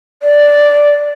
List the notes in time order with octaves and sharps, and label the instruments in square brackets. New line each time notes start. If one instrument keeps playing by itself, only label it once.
[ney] D5